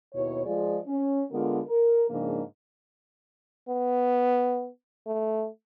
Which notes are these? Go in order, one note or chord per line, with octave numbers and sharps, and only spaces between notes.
D#2 B2 E4 C#5
F3 G#3 F4 G#4 D5
C#4
D3 G#3 B3 F4 A#4
A#4
G#2 C#3 F3 A#3 D4
B3
A3